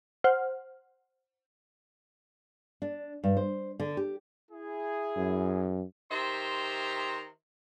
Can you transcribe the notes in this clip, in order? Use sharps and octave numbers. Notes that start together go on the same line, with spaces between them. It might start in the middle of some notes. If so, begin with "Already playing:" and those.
C5 F#5 F6
D4
G2
C5
D3
G4
E4 G#4
F#2
D#3 G4 C5 E5 A#5 C6